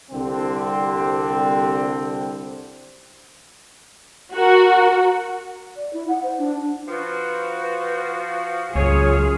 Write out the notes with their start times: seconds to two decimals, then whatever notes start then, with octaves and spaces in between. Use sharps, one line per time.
0.11 C2 D3 G3 C4
4.34 F#4 A#4
5.77 D5
5.93 E4
6.08 F#5
6.23 C5
6.38 D4
6.88 F3 F4 F#4 B4
8.76 C#2 F#2 F4 G#4 C#5